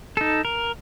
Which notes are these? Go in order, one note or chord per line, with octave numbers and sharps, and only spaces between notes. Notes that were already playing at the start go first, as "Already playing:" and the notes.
D#4 A4
A#4